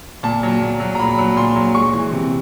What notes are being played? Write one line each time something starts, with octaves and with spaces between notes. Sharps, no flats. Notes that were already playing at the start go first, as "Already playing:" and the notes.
A#2 A5
F#3
A#2
F#3
A#5
A#2 B5
F#3
A#2 C6
F#3
G#3 C#6
E3
C3